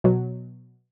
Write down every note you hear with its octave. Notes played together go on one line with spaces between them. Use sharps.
B2 F#3